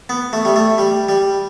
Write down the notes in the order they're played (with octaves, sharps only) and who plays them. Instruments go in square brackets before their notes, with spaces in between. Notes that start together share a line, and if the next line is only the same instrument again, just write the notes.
[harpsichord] B3
A3
G3
A3
G3
G3